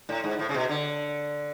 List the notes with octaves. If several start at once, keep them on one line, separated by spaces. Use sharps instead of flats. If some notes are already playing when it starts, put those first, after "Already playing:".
A2
G#2
A2
C#3
B2
D3